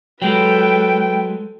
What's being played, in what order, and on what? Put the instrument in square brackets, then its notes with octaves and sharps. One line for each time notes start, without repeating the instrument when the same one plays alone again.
[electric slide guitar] F#3 G#3 [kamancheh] A4 B4 [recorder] G5